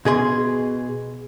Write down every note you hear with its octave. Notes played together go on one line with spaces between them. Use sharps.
B2 G#4 D5 C6